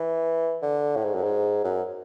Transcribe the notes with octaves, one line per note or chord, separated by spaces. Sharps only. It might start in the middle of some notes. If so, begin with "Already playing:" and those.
Already playing: E3
D3
A2
G#2
F#2
G#2
F#2